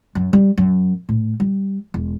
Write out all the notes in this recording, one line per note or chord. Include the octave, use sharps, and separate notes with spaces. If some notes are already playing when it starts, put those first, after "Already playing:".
F#2
G3
F#2
A2
G3
E1